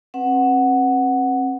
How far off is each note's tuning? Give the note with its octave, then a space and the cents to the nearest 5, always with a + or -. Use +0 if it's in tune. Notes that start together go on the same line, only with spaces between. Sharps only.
C4 +40 B4 +0 F#5 +0